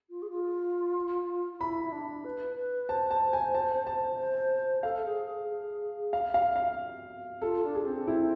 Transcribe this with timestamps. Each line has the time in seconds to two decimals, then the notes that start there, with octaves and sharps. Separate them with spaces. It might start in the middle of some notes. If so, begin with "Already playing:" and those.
0.10 F4
0.22 G#4
0.30 F4
1.53 F4
1.60 E4 B5
1.84 E4
1.92 D4
2.24 B4
2.57 B4
2.89 C5 A5
3.11 A5
3.33 G#5
3.55 A5
3.87 A5
4.18 C5
4.83 A4 F5
5.06 G#4
5.26 G#4
5.48 G#4
6.13 F5
6.34 F5
6.56 F5
7.42 F4 A4
7.64 D4
7.75 G#4
7.86 C4
8.07 E4